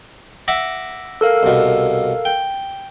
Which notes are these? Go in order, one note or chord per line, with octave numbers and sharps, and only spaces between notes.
E5 F#5 D6 A#6
A4 A#4 F5
C2 B2
G5